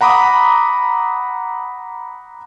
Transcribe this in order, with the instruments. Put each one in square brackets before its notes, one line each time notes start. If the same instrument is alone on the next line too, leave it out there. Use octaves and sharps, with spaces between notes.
[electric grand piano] F#5 A#5 B5 D6 D#6